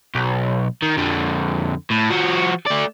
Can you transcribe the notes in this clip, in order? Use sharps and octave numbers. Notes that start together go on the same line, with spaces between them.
B1
D#3
F2 D3
A2
F3 F#4
A3 D5